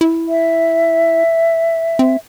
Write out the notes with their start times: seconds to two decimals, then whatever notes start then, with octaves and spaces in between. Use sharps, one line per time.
0.01 E4
0.28 E5
1.99 C4